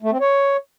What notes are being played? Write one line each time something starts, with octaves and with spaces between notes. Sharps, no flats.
A3
C4
C#5